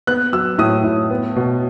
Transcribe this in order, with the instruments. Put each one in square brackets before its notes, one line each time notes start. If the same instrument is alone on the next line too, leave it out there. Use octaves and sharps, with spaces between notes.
[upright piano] B3 F#6
F#3 E6
A2 D#6
A2
B3
B2